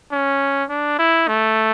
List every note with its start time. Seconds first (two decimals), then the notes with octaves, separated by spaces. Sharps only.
0.11 C#4
0.69 D4
0.99 E4
1.28 A3